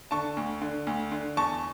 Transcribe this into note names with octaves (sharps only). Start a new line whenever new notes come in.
D3 A5 C#6
D2
D3
D2
D3
E2 A5 C#6